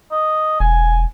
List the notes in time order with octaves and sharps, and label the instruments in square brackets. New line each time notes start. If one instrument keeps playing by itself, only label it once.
[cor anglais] D#5
[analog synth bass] E1 [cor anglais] G#5